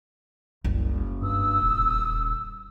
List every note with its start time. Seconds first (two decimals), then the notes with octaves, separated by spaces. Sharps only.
0.64 F#1 C2
1.22 G2 D#6 E6
1.61 D#1